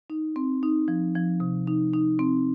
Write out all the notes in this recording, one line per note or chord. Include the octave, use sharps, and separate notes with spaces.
D#4
C4
D#4
F3
F3
C3
D#4
D#4
C4